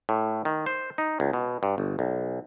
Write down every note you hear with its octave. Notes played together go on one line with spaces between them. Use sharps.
A2
D#3
C5
D#4
C#2
B2
G2
G1
B1